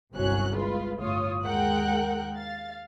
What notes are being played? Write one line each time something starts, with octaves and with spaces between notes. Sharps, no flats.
G1 C2 F#3 C#4 F#6
G#3 F4 B4
G1 A2 F4 C#5 D#6
D#2 G#3 A#4 F#5 G5 F#6
F5 A6